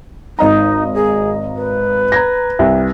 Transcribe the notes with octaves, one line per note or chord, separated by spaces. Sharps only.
G#1 D#4 D#5 A#5
G#4
B4
A#5 G#6 A#6
C2